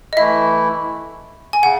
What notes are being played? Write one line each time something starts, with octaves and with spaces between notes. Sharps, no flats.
D#5
E3 A3 E4 E5
G#5
C#3 F#5